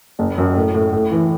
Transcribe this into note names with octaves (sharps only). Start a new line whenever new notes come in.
F#1
F#2
A2
A2
A2
E3